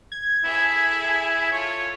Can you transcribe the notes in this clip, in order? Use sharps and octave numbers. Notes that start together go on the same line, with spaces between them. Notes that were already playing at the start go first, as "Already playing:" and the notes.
G#6
E4 G#4 A4 E5
F4 A4 C#5